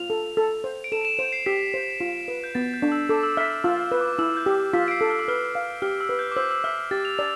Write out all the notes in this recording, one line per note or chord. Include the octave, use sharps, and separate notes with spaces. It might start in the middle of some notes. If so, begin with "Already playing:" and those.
Already playing: F4 F7
A4
A4
C5
D7
A4 E7
D7
E7
C5 D7
C7
G4 B6
C5
F4
B4
G6
B3 A6
G6
D4
E6
A4 D6
E6
E5 F6
E6
F4 E6
E6
B4
D6
E4 E6
G6
G4
F4 B6
D7
C7
A4
F6
E6
B4 F6
F5
G4 F6
E6
B4
G6
D6
C5 E6
E6
E5 F6
F6
G4 A6
F7
D5 F7